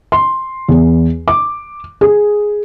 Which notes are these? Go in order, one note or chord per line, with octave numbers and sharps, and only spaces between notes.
C6
E2
D6
G#4